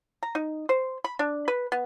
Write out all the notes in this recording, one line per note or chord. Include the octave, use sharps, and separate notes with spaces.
A#5
D#4
C5
B5
D4
B4
B3